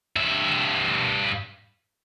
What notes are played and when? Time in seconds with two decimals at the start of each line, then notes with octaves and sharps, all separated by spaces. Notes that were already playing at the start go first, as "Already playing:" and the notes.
0.16 G2 E5